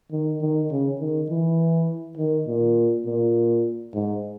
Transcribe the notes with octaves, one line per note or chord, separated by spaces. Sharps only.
D#3
D#3
C#3
D#3
E3
D#3
A#2
A#2
G#2